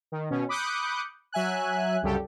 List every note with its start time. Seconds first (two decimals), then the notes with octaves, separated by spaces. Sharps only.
0.12 D#3
0.30 B2 C#4
0.49 B5 D6 D#6 F#6 G6 C#7
1.32 F#3 E5 G#5 F#6
2.03 C2 F#2 C#3 G3 G4 A4